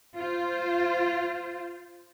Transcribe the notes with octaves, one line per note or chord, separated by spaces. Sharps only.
F4 C5